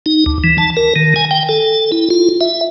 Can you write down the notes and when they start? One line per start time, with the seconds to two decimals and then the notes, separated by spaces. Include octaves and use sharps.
0.06 D#4
0.26 D2
0.44 E3
0.58 A5
0.77 A#4
0.96 D#3
1.16 G#5
1.31 G5
1.49 A4
1.92 E4
2.10 F4
2.41 E5